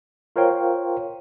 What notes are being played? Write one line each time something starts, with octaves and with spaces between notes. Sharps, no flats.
F4 A#4 C5 C#5 F5 G5